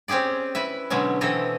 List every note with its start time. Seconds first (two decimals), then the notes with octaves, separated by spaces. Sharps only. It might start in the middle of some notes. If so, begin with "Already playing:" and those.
0.08 C4 C#4 G4 G#4 D5
0.55 E4 B4 E5
0.90 B2 D3 F#3 G#3 C#4
1.21 B2 E3 C4 A4 C#5 D#5